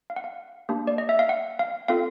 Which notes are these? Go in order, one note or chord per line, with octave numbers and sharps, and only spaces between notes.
F5
F#5
F5
A#3 D4 G4
D5
D#5
E5
F5
F#5
F5
C4 F4 A4 F5